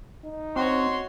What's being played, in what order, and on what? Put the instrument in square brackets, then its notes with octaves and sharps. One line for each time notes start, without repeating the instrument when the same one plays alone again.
[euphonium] D#4
[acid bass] C4 [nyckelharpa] F#4 C#5 [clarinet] C6